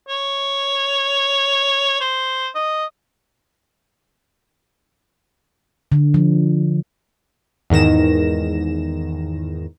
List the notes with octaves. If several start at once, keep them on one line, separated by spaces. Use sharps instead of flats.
C#5
C5
D#5
D3
F3
E2 G#2 D#3 A#6 E7